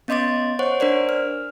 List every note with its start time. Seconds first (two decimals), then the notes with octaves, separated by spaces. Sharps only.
0.08 B3 C#4 D#5 C6 D6 A6
0.59 C5 C#5 F#5 C#6
0.80 D4 A#4 C5 D5
1.09 F6